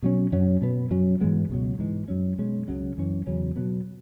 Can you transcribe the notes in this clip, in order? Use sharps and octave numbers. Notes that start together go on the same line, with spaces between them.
B2 F#3 C#4
F#2 F#3 C#4
B2 B3
F#2 F#3 C#4
G#2 E3 G#3 B3
C#2 B2 F#3
G#2 E3 G#3
F#2 F#3 C#4
B2 G#3 C#4
C#2 C#3 F#3 C#4
F#2 E3 C#4
E2 C#3 F#3 C#4
B2 F#3 B3